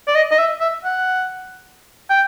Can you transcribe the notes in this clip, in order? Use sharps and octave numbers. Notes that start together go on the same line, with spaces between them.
D5
D#5
D#5
E5
E5
F#5
G5